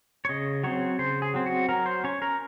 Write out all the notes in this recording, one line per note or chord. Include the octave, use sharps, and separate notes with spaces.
C#5
C#3 D#5
F#3 C4 C#5
C#3 C5
G#4
F#3 C4
F#4
F#3 A#4
C5
C#4 C#5
A#4